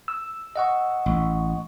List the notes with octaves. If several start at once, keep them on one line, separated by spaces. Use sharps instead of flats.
E6
D#5 F#5 C#6
A1